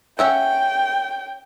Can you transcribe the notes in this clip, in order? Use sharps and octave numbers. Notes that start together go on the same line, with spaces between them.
C#4 E5 F#5 G5